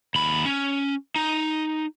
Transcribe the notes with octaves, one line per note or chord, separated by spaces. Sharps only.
D#2 B5
C#4
D#4